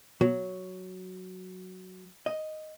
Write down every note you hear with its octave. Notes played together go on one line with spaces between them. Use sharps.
B2 F#3
D#5